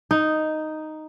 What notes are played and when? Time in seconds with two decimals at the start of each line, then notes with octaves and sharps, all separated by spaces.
0.11 D#4